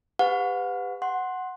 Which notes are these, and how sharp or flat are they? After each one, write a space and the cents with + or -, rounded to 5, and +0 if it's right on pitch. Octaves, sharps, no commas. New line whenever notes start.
G4 +35 B4 +30 F#5 -40
F#5 +0 C6 +15